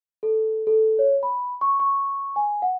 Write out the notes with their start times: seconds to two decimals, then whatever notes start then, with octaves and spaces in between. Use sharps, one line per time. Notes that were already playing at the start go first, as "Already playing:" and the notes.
0.23 A4
0.67 A4
0.99 C#5
1.23 B5
1.61 C#6
1.80 C#6
2.36 G#5
2.62 F#5